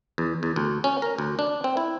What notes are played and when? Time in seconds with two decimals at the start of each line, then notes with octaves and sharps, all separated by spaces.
0.18 E2
0.43 E2
0.56 D2
0.84 C#4
1.02 A#4
1.18 D2
1.39 D4
1.64 C4
1.77 E4